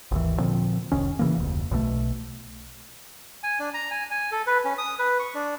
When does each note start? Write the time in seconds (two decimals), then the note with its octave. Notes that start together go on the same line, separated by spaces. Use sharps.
0.11 G#1 D#2 E3
0.39 A#2 D3 F3 C4
0.92 F1 C2 D#3 C#4
1.19 C#3 E3 A#3
1.37 F1 D2
1.71 B1 B2 E3 A3
3.43 G#5
3.59 D4
3.74 A#5
3.91 G#5
4.11 G#5
4.32 A4
4.47 B4
4.65 C#4
4.78 D#6
4.99 B4
5.19 C#6
5.34 D4